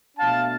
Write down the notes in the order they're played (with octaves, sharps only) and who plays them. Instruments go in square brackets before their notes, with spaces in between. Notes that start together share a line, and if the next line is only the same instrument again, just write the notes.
[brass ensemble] B2 A3 D4 F5 A5